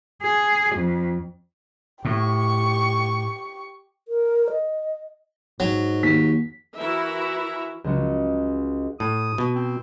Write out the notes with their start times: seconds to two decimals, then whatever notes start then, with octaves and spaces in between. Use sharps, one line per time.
0.23 G#4
0.76 F2
2.05 A2 G4 C#6
4.08 A#4
4.51 D#5
5.60 G#2 F#3
6.03 D#2 B6
6.78 E3 E4 F#4 A#4 E5
7.84 C#2 F#3 G#3 C#7
9.00 A2 D#6
9.38 B2
9.55 C4